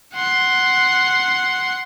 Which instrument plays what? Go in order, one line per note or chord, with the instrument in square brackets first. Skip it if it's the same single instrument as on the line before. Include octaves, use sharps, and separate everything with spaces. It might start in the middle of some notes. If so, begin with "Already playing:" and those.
[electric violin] F#5 C6